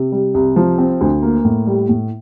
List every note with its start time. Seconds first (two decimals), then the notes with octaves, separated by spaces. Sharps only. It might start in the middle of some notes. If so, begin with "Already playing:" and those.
Already playing: C3
0.12 G3
0.34 C2
0.56 F3
0.78 C4
1.01 D2
1.23 A#3
1.45 A2
1.67 G3
1.89 A2